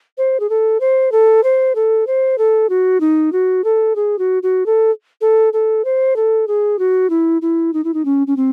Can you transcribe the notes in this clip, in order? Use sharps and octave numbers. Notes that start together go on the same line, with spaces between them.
C5
G#4
A4
C5
A4
C5
A4
C5
A4
F#4
D#4
F#4
A4
G#4
F#4
F#4
A4
A4
A4
C5
A4
G#4
F#4
E4
E4
D#4
E4
D#4
C#4
C#4
C4